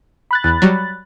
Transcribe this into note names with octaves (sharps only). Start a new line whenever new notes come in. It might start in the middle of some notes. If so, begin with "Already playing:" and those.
B5 F#6 A6
E2
F#3 G3